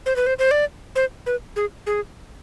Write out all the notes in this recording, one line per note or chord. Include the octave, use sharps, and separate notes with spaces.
C5
B4
C5
C5
D5
C5
B4
G#4
G#4